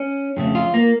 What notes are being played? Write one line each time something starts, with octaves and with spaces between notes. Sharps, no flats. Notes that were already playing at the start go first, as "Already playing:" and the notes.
Already playing: C#4
F2 C#3 A3
F4
A#3